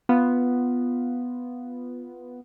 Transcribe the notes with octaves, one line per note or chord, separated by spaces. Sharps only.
B3 F4